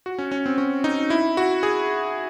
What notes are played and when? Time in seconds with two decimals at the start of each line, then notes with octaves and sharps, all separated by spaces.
0.06 F#4
0.18 C#4
0.32 C#4
0.46 C4
0.58 C#4
0.84 D#4
1.10 E4
1.37 F#4
1.63 G#4